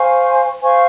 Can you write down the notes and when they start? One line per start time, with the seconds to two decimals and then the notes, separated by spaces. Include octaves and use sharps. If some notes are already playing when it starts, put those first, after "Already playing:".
Already playing: C5 F5 G#5 C#6
0.62 C5 F5 G#5 C#6